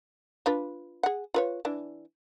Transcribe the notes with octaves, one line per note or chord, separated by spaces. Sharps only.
D4 F4 B4
G#4 F#5
F4 B4 C#5
E3 D4